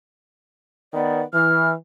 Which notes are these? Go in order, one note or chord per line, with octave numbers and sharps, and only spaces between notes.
D#3 B3 D5
E3 F6